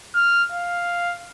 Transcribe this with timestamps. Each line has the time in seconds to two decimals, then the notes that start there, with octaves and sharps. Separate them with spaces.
0.15 F6
0.52 F5